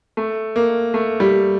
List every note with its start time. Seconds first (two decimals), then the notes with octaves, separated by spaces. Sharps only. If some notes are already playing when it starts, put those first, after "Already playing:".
0.17 A3
0.56 A#3
0.94 A3
1.20 G3